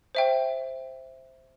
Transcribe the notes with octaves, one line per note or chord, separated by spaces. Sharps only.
C5 E5 G5